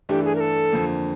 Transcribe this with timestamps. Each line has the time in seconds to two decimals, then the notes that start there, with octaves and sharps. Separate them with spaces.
0.09 G2 E3 A3 D4 G4
0.24 G#4
0.35 A#4
0.40 A4
0.72 F2 D3 F3 A#3